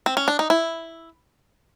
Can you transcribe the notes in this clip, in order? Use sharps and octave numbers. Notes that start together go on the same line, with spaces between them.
C4
C#4
D4
D#4
E4